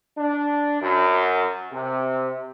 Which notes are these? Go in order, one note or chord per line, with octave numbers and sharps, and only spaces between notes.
D4
F#2
C3